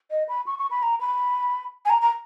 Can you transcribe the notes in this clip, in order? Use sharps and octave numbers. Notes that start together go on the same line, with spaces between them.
D#5
B5
C#6
C#6
B5
A#5
B5
G#5
A#5
A#5